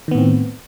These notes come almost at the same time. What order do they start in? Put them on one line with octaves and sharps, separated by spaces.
D#3 B3 A2 C4